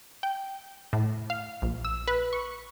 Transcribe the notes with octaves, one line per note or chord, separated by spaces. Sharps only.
G5
A2
F5
A#1
E6
B4
C#6